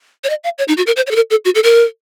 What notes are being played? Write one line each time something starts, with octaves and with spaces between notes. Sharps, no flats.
C#5
D#5
F5
C#5
D#4
F#4
A#4
C5
C#5
A4
A#4
A4
F#4
A4
A#4